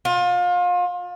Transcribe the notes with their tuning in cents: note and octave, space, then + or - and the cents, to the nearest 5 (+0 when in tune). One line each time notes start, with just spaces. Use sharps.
F4 +30